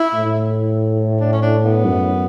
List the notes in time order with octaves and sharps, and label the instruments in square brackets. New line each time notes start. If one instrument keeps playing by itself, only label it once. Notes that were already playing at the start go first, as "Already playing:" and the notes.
Already playing: [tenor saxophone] E4
[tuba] A2
[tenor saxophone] D4
C#4
D4
B3
[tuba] F#2